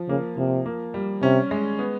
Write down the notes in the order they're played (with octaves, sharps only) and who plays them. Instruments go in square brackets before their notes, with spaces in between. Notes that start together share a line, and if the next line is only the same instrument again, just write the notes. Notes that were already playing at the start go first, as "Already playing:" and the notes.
Already playing: [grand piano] F3
[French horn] C#3 [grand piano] A#3
[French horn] C3 [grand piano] F3
[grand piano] A#3
G3
[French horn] C3 [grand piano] C#4
[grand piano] G#3
B3